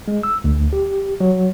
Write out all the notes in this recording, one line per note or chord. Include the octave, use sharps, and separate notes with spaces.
G#3
E6
D2
G4
F#3